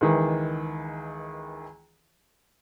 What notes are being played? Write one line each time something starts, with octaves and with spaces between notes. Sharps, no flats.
C#2 D#3 E3